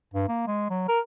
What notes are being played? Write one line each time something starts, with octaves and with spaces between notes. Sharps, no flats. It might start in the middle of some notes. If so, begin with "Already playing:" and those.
G2
A#3
G#3
F#3
A#4